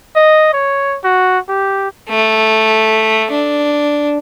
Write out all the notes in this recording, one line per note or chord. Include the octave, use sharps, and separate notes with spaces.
D#5
C#5
F#4
G4
A3
D4